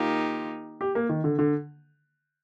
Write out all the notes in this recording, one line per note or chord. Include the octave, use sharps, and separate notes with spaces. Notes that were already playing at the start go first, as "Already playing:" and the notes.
Already playing: D#3 A#3 D#4 F4 G4
G4
A#3
D#3
D3
D3